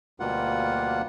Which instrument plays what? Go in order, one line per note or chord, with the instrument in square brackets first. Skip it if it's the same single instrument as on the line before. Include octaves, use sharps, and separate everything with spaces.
[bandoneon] D2 B2 G3 A#3 F4 F#5